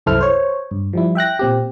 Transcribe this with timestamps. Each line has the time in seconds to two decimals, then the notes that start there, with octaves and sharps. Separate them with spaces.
0.06 C2 F#2 E4 A4 C5 F6
0.21 C5 C#5
0.71 G2
0.93 F3 G3 E4
1.15 E5 G5 F#6 A#6
1.39 A#2 C4 G4